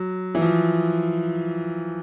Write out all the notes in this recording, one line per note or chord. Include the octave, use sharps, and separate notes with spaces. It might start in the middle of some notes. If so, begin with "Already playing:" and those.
Already playing: F#3
E3
F3